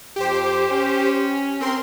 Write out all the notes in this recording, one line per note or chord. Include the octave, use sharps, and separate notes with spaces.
F2 G4 C5
C#4
C4 A#4 C6